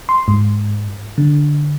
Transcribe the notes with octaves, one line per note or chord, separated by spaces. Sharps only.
C6
G#2
D3